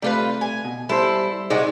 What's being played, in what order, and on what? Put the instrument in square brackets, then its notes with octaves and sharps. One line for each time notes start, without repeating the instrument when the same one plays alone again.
[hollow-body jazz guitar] C3 A3 [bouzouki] G3 F4 B4
[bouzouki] G#5
[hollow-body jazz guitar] B2
[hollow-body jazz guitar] G3 C5 [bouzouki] E4 A4
[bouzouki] C3 G#3 F#4 [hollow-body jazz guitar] D#4 G#4 D5